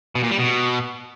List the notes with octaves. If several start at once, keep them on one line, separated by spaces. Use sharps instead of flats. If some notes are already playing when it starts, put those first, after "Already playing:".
B2
A#2
G3
B2